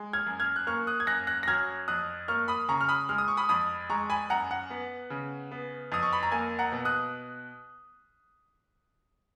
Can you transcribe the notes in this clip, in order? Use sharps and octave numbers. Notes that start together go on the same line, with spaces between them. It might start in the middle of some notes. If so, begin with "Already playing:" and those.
Already playing: G#3
F6 G#6
F#2
F6 G#6
F#6
A#3 C#6 F6
D#6 F#6
G#6
F#2 F#6 A#6
F#6 A#6
A#6
F#3 F6 G#6
F2 D#6 F#6
A#3 C#6 F6
B5 D#6
C#3 A#5 C#6
F6
B5 D#6
G#3 F6
D#6
C#6
B5 D#6
F2 B5 D#6
G#3 A#5 C#6
G#5 B5
F#2 F#5 A#5
F#5
B3
C#3
B3
F2 D#6
C#6
B5
A#5
A#3 G#5
F#5 A#5
B2
D#6 F#6